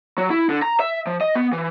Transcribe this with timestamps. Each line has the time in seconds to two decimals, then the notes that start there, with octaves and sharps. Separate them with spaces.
0.18 F#3
0.30 E4
0.50 D3
0.62 A#5
0.80 E5
1.07 F3
1.21 D#5
1.35 B3
1.53 E3